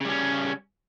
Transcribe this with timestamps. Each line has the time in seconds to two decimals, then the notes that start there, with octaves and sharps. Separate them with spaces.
0.01 C#3
0.05 G3
0.09 C#4